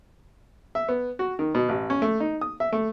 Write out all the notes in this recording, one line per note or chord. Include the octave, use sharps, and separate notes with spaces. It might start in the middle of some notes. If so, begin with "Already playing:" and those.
E5
B3
F#4
D#3
B2
A1
C#4
A3
D#4
D#6
E5
A3